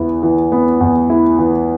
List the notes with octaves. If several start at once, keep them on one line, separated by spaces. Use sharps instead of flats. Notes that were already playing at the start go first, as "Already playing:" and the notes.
Already playing: E2 B3 E4
E3
B3
E2
E4
E3